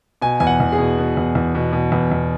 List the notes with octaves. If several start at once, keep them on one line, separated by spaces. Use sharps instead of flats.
B2 G#5
E2 G#5
F#5
E2
G#4
B2
B2
E2
E2
B2
B2
E2
E2